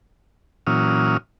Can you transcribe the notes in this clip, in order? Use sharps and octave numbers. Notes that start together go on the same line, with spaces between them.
A#2 E3 F#3 C#4 D#6 F6